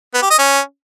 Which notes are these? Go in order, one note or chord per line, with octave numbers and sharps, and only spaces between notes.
B3
G4
D#5
C#4